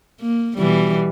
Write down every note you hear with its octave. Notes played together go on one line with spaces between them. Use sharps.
A#3
B2 E3 G3